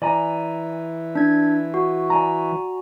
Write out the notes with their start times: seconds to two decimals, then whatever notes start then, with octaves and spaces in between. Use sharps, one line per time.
0.02 E3 D5 G#5 A#5
1.15 D4 G#6
1.74 F#4
2.10 D5 G#5 A#5